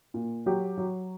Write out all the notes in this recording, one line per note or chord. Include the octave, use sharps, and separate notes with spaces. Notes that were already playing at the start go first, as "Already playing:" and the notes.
A#2
F#3 G4
F#3